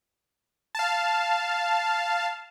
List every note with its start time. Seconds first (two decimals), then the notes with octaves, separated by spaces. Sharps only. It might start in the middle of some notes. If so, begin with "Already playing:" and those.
0.75 F5 A5